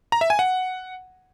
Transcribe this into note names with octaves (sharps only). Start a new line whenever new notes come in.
A#5
E5
G#5
F#5